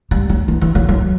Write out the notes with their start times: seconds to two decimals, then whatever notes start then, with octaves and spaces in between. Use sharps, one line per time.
0.11 G3
0.29 F#3
0.48 E3
0.61 E3
0.75 F#3
0.88 F#3